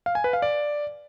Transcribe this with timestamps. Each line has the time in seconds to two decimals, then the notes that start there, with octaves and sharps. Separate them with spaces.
0.06 F5
0.15 G#5
0.24 B4
0.33 F5
0.42 D5